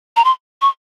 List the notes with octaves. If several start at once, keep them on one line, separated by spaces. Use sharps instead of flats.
A#5
C6
C#6